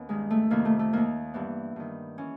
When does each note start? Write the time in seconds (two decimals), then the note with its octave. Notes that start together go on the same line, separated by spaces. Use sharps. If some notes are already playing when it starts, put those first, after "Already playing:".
Already playing: D#2 B3 C#4
0.09 G2 D#3 G#3
0.31 A3
0.51 F2 C3 D#3 A#3
0.65 A3
0.79 A3
0.93 D#2 D#3 A#3
1.34 G2 E3 B3
1.76 G2 D#3
2.18 E3 C#4